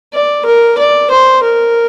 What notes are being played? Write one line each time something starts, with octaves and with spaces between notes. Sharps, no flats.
D5
A#4
D5
C5
A#4